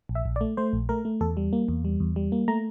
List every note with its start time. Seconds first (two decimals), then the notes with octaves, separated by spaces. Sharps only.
0.09 A#1
0.15 E5
0.26 A#1
0.36 D5
0.41 A3
0.57 A3 C5
0.73 A#1
0.89 A3 A#4
1.05 A3
1.20 E2 A4
1.37 G3
1.53 A#3
1.68 E2
1.85 G3
2.00 E2
2.16 G3
2.32 A#3
2.48 A3 A#5